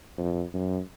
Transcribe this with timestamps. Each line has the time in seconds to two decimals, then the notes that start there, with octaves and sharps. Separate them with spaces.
0.18 F2
0.54 F#2